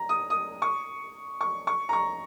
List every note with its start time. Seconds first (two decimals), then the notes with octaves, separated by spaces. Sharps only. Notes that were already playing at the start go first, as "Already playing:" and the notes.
Already playing: A#5
0.09 D#6
0.30 D#6
0.62 C#6
1.41 C#6
1.67 C#6
1.89 A#5
1.93 C#6